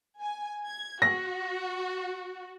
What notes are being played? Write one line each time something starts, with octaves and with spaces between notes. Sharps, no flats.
G#5
G#6
F#4 A#6